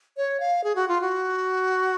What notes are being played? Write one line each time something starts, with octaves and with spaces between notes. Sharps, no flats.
C#5
F5
G#4
F#4
F4
F#4